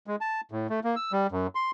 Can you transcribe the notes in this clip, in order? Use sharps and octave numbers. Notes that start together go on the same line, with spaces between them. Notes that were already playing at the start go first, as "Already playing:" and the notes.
G#3
A5
A2
A3
A#3
E6
G3
F#2
C6